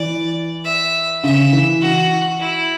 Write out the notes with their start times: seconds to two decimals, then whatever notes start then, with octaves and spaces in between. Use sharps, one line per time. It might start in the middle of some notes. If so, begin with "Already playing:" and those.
Already playing: E3 D5
0.65 E5
1.23 C#3 E5
1.53 E3
1.81 F#4
2.40 E4